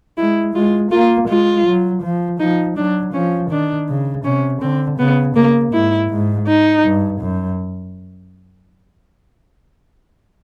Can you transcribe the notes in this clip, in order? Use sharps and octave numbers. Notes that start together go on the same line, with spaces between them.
G#3 E4
G#3 F4
A#3 F4
G#3 F4
F#3
F3
F3 D#4
F#3 D4
F3 C#4
D#3 D4
C#3
C3 C#4
D3 C4
C#3 B3
C#3 A#3
G#2 E4
G#2
D#4
G2
F#2